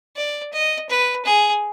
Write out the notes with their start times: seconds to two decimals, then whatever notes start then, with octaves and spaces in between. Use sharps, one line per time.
0.16 D5
0.53 D#5
0.89 B4
1.25 G#4